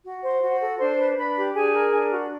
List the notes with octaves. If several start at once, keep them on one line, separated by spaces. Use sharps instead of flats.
F#4
C5
F#4
A4
D4 C5 C6
B4
D4 B4 B5
G4
D4 G#4 G#5
A#4
D4
F#4